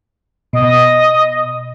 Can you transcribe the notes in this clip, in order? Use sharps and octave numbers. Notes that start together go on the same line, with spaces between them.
B2 D#5